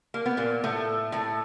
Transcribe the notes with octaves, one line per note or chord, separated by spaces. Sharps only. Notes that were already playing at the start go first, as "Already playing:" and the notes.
A#3
B3
A#2 A#3
A2 A3
A2 A3